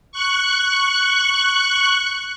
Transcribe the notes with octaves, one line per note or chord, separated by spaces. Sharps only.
C#6 F#6